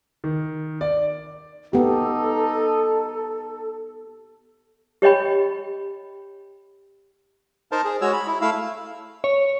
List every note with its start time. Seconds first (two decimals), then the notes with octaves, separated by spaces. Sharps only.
0.24 D#3
0.81 D5
1.73 B3 D#4 G4 A4
5.02 G4 C#5 D#5 G5 B5
7.72 D#4 A#4 C5 A5
7.85 G#4
8.01 G#3 F#4 C#5 E6
8.13 B5
8.27 E4
8.42 A3 E4 F5 E6
9.24 C#5